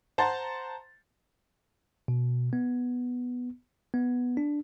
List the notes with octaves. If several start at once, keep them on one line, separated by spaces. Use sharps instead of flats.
C5 F#5 A5 A#5 C6 A6
B2
B3
B3
D4